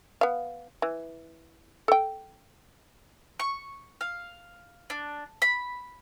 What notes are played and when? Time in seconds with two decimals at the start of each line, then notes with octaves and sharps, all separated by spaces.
0.21 B3 F5
0.82 E3
1.88 A4 G5
3.40 C#6
4.01 F5
4.90 D4
5.42 B5